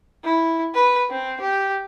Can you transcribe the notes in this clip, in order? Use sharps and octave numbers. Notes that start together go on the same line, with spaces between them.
E4
B4
C4
G4